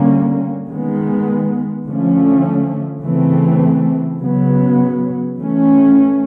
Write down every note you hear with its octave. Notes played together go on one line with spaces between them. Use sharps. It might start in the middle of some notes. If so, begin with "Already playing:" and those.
Already playing: D3 G3 A#3 C#4
D#3 G#3 B3
D3 F3 A3 C#4
C#3 E3 A3 C4
C#3 F#3 B3
E3 A3 C#4